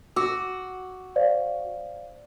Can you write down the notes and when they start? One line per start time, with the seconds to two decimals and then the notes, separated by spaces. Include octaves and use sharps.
0.16 F#4 D6 E6
1.16 C5 D5 F5